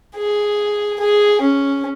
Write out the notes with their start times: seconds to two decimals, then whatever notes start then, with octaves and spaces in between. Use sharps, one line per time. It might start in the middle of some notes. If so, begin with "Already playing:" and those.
0.16 G#4
1.00 G#4
1.41 C#4